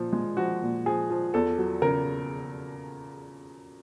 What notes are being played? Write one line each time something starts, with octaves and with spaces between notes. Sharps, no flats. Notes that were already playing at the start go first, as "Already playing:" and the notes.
Already playing: A#2 F3
G#3
F3 F#4
A#2
F3 G#4
F3
E2 A4
F#3
C#3 A#4